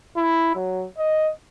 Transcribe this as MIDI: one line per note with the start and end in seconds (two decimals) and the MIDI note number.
0.17 0.54 64
0.55 0.86 54
0.98 1.29 75